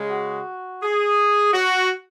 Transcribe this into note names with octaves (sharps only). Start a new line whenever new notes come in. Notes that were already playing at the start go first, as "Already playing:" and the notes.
Already playing: C#3 G#3
F#4
G#4
F#4